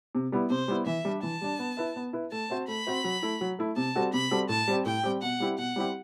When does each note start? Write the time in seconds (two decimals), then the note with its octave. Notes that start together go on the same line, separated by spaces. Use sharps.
0.15 C3
0.32 G3 B3 E4
0.50 C3 C5
0.68 G3 B3 E4
0.86 E3 E5
1.05 G3 D4
1.23 E3 A5
1.41 G3 D4
1.59 B3
1.77 E4 B4 E5
1.96 B3
2.13 E4 B4 E5
2.32 A3 A5
2.50 C4 F#4 C5
2.68 A3 B5
2.87 C4 F#4 C5
3.04 F#3
3.23 A3 E4
3.41 F#3
3.59 A3 E4
3.76 C3 A5
3.95 G3 C4 F#4 A4
4.13 C3 B5
4.31 G3 C4 F#4 A4
4.49 A2 A5
4.68 G3 C4 G4
4.86 A2 G5
5.03 G3 C4 G4
5.22 B2 F#5
5.40 G3 C4 E4 G4
5.58 B2 F#5
5.76 G3 C4 E4 G4